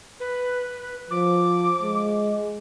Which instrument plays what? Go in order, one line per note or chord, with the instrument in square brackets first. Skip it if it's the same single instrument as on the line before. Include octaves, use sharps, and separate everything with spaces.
[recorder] B4
[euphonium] F3 [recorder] D6
[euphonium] G#3